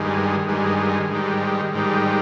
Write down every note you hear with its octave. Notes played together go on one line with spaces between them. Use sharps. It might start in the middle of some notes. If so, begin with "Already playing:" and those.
Already playing: G2 D#3 G#3
G2 D#3 G#3
G#2 D#3 G3
G#2 D#3 G3